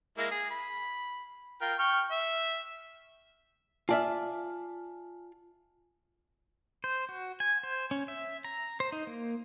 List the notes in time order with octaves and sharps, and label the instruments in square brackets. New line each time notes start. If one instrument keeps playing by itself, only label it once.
[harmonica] G#3 A#3 E4
G#4
B5
F4 A#4 G5
G5 C#6 F6
E5
[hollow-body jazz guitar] F4 D5 E5 [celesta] G#5 A5 F6
[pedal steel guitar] C5
F#4
G#5
C5
C#4
E5
A#5
C5
D#4
A#3